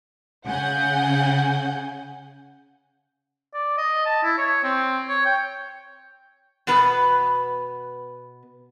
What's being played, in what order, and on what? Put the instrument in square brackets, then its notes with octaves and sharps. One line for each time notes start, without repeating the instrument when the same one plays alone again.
[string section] C#3 F#5 G#5 G6
[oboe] D5
D#5
A5
E4
C#5
C4
C#5
G5
[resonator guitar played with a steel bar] B2 B3 B4